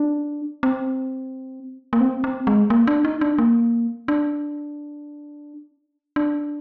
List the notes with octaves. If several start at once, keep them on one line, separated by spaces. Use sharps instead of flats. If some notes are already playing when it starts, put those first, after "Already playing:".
Already playing: D4
C4
A#3
C4
C4
G#3
A#3
D4
D#4
D4
A#3
D4
D4